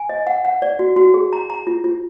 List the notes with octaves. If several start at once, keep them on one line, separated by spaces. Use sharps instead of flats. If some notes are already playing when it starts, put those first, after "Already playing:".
Already playing: G#5
D#5
F#5
F#5
D5
F#4
F#4
G#4
A#5
A#5
F4
F4